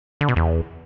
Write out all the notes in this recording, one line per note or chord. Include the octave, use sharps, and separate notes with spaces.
D3
B2
E2